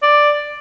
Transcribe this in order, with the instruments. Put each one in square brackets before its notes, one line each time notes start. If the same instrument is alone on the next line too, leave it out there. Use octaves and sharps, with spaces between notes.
[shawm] D5